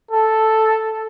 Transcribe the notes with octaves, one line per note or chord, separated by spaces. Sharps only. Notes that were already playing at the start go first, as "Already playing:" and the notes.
A4